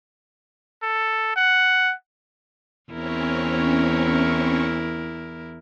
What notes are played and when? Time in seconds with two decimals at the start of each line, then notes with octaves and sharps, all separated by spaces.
0.83 A4
1.36 F#5
2.92 E2 C4 C#4 E4 A#4 C#5